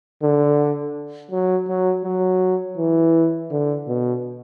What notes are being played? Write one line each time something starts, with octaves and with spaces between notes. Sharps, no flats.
D3
F#3
F#3
F#3
E3
D3
B2